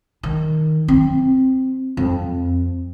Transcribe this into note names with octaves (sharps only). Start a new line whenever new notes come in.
D#3
C4
F2